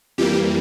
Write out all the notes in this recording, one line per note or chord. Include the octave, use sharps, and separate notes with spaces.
F2 E3 G3 A#3 G4